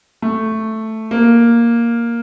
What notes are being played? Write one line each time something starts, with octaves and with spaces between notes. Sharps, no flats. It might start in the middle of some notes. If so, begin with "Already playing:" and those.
A3
A#3